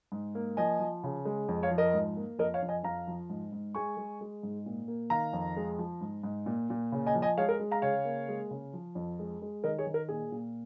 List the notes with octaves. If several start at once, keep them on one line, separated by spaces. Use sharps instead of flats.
G#2
A#3
F3 D#5 G#5
F3
C#3
G#3
F2
C#5 F5
F3
A#4 D#5
G#2
A#3
F2 A#4 D#5
C#5 F5
F2
D#5 G#5
F2 F5 A#5
F3
G#2
G#2
G#3 G#5 C#6
G#3
G#3
G#2
A#2
A#3
D#3 F5 A#5
F2
G#3
F3
G#2
G#2
A#2
A#2
C#3
D#5 G#5
F3
D#5 G#5
G#3 C#5 F5
A#4
G#3
F5 A#5
C#3 C#5 F5
A#3
G#3
C#3
F3
F2
G#3
G#3
D#3 A#4 D#5
G#4 C#5
D#3
A#4
A#2 G#4
A#2